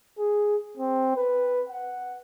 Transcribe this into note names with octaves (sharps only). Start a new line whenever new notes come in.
G#4
C4
B4
F#5